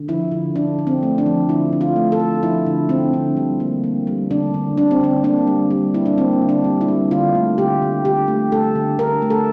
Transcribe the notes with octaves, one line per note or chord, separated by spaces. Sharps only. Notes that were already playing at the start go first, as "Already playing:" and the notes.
Already playing: D3
F3 E4
D3
D3 D4
D3
C4
A3
D4
F3
D3 E4
D3
F4
A3
A4
A3
F3 E4
D3
D3 C4
D3
G3
A#3
A#3
G3
D3 D4
D3
G3 D4
C4
D3 D4
A#3 D4
G3
G3
A#3 E4
D4
A#3 C4
D3
D4
G3
E4
G3
D3 F4
A3
D3 G4
D3
D3 G4
A3
A3 A4
D3
D3 A#4
A3
A4